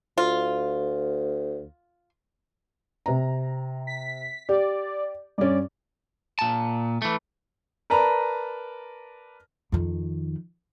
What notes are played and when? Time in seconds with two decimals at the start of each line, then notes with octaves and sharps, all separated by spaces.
0.18 D2 F4
3.06 C3 A#5
3.87 B6
4.49 G4 D5
5.38 G2 C#4 D5
6.39 A#2 A5
7.02 E3 A3
7.90 A#4 B4 D5 A5 A#5
9.72 F2 D#3